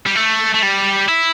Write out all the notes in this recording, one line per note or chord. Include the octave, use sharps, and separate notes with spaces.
G3
A3
A3
G3
E4